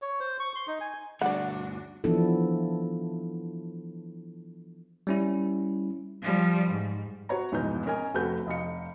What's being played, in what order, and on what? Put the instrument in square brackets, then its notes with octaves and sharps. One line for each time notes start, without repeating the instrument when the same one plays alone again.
[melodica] C#5
C5
C#6
C6
D#4
G#5
[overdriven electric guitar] D2 G2 [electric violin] D4 F#4 [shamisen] D5 F#5
[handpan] E3 F3 B3 D4 E4 A4
[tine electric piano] G3 C#4 E4
[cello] F3 G3
G#2
[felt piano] F#4 C5 C#5 A#5
F1 G#2 B2 E3 D#4 G6
C#4 A#4 D#5 G#5
F1 A3 C4 F#4 B4 G6
F1 D#5 F5 C#7